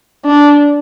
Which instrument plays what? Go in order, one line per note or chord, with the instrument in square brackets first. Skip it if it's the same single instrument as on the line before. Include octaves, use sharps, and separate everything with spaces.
[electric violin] D4